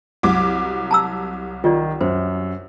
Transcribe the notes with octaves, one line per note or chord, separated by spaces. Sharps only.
C2 F#3 F#5 D6
A5 A#5 E6
D#3 F4 D5
F#2 C5